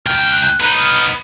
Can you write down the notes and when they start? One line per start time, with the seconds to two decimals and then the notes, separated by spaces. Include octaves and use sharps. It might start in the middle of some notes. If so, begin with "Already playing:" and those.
0.06 C#2 G5 F6
0.31 F#6
0.60 B3 D#4
0.79 F6